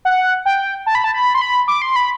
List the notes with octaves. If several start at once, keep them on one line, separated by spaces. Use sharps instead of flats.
F#5
G5
A5
B5
A5
B5
C6
B5
D6
C6
B5